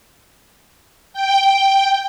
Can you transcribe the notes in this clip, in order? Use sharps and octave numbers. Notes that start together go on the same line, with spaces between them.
G5